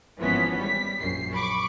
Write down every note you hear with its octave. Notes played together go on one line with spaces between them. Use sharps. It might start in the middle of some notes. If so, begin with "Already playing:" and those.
G#1 E3 F3 B3 C#4 B6
G3 B6
A#1 F#2 C7
B5 C#6 D6